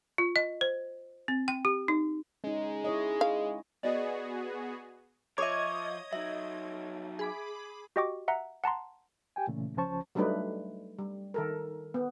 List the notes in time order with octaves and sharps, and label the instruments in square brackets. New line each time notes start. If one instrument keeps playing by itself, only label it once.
[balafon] F4
D#5
C5
C4
G5
G4
D#4
[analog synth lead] G#3 [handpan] C#4 D#4
[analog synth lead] G#3 [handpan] E4 C#5 D#5
[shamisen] F5
[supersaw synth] B3 F#4 G#4 [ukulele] D5 D#5
[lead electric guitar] F3 [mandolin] C#5 [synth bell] D#5 D#6 G#6 [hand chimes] E5 D6
[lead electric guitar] F#3 D#4 [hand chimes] E5
[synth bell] G#4 B5 D6
[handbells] F#4 G4 D#5 G5 C#6 D6
E5 F#5 A#5
F#5 A5 A#5 C6
[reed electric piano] G4 G5 G#5
A#2 C#3 E3 A3 C#4
C#2 F3 C#4 C5 A5 C#6
[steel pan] F#3 G3 A3 D4 D#4 B4
G3
D#3 A4 A#4
B3